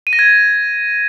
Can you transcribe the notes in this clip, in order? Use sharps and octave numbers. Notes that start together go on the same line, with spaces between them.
D#7
A#6
G#6